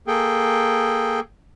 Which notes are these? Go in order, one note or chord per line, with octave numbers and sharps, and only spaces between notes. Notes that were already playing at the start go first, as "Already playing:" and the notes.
A#3 G#4 A4 G5